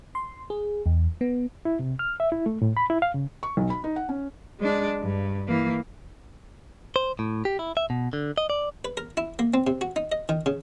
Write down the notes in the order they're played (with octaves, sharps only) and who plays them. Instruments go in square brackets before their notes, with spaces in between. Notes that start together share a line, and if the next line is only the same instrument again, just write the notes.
[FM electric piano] C6
G#4
E2
B3
[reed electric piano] E4
C3
F6
E5
E4
A3
A2
B5
E4
F5
C#3
[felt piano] C#6
B1
B5
D#4
F#5
C#4
[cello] G#3 D4
G2
E3 A#3
[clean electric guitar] C5
A2
G4
E4
E5
B2
D3
D#5
D5
[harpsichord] B4
A#4
E4
A#3
C4
C3
F#4
D#4
D#5
D#3
C#3